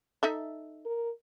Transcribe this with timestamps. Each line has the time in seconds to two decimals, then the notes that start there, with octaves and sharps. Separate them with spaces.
0.23 D#4 A4 E5
0.85 A#4